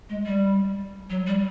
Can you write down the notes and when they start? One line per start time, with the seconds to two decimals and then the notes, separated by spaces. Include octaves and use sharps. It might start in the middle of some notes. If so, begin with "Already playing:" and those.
0.09 G#3
0.26 G3
1.10 F#3
1.26 G3